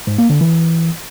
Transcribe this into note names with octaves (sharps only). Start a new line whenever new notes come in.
G#2
A#3
D3
E3